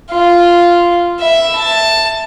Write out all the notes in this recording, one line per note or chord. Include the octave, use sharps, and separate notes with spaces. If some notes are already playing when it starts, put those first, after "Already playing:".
F4
E5 B5
A5